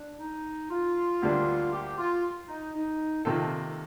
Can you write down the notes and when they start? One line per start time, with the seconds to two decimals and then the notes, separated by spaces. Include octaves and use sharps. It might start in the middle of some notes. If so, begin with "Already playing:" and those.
Already playing: D4
0.19 D#4
0.70 F4
1.22 D2 D3 G3 A#3 D4
1.73 G4
1.98 F4
2.48 D#4
2.74 D#4
3.25 C3 D#3 A#3 C4 F4 A4